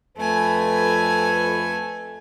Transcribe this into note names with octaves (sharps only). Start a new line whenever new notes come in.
F2 A3 B4 G#5